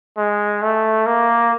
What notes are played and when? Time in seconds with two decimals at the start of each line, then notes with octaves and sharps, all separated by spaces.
0.18 G#3
0.62 A3
1.07 A#3